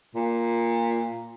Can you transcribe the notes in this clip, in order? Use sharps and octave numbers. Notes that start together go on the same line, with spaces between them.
A#2